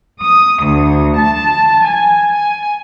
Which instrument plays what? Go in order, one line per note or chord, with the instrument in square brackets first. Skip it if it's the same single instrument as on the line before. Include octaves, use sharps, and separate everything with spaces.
[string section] D#6
D2
A5
G#5
G#5